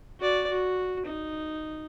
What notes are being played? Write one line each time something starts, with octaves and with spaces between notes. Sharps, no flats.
F#4 D5
F#4
D#4